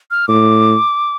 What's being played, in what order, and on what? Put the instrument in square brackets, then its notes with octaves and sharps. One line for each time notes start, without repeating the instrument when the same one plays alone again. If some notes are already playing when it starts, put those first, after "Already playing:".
[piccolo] F6
[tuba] A2 [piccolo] D6